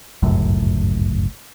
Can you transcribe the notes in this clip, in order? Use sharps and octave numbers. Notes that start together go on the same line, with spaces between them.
G1 C#2 F#2 A2